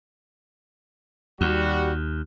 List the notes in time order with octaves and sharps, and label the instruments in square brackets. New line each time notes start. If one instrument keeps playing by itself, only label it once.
[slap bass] D#2 [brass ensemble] G3 F#4